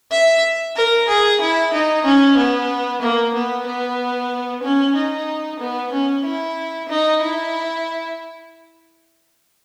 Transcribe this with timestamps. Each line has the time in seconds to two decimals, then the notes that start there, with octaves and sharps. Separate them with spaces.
0.11 E5
0.76 A#4
1.08 G#4
1.41 E4
1.73 D#4
2.05 C#4
2.37 B3
3.01 A#3
3.34 B3
3.66 B3
4.63 C#4
4.95 D#4
5.59 B3
5.92 C#4
6.24 E4
6.89 D#4
7.21 E4